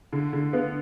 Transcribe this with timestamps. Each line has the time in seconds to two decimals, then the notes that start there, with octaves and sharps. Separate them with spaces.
0.13 D3
0.33 D3
0.53 B3